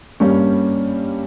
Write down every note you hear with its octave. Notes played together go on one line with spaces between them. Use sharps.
G2 G3 A#3 C#4